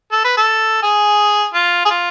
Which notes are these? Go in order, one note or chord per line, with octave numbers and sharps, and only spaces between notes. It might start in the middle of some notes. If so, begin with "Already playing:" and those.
A4
B4
A4
G#4
F4
G#4
F4